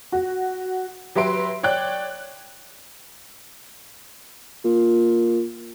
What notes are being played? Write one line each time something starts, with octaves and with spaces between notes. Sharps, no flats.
F#4
F#3 G4 B4 E5 C6 D7
C#5 D5 G5 F#6
A#2